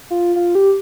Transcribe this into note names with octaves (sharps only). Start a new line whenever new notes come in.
F4
F4
G4